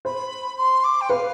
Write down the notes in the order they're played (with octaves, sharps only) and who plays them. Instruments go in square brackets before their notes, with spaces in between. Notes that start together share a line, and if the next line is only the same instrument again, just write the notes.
[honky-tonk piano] C5 [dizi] B5
[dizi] C6
D6
G5
[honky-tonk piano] B4 [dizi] F5